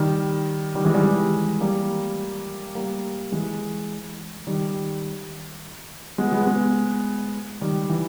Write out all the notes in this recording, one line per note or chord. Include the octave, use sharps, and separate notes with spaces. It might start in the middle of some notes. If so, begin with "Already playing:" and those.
Already playing: D#3 G3
D#3 G3
E3 G#3
D#3 G3
E3 G#3
G3 A#3
G3 A#3
E3 G#3
D#3 G3
G#3 B3
G#3 B3
G#3 B3
D#3 G3
E3